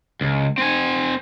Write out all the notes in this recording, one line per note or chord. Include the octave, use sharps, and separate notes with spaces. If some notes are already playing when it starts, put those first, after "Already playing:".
C#2
C4 G#5